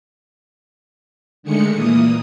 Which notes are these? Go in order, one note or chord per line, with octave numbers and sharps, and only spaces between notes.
D3 D#3 G#3 A3 C#7
A#2 E3 A#3 D#6